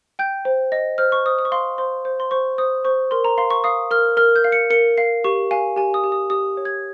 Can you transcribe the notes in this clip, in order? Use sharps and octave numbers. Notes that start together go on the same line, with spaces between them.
G5 G6
C5
D#5
C5 F6
C#6
C5 D#6
D#6
C#6
F5 C6
C5 C6
C5
C6
C5 C#6
C5 D#6
C5 C#6
A#4 C6
A#5
F5 C6
C#6
F5 D#6
A#4 F6
A#4 F6
G6
F5
C#7
A#4 C#7
F5 C7
G4 C#6
F5 G#5
G4 G#5
D#6
G4
D#6
G4 D#6
C#5
G#6